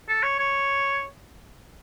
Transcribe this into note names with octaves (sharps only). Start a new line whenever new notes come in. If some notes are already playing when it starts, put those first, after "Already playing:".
A4
C#5
C#5